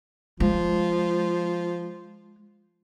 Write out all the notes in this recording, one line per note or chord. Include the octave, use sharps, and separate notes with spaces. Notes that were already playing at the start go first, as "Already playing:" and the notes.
F3 G#3